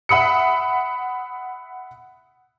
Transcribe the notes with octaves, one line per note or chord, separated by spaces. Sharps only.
E5 F#5 B5 D#6 C#7